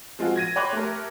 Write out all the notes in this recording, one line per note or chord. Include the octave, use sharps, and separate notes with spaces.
F3 G#3 C4 F4 F#4
G#6 A#6 D#7
C#5 G5 B5 C6 D6 F#6
A3 G4 A#4